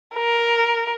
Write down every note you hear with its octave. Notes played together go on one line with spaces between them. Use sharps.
A#4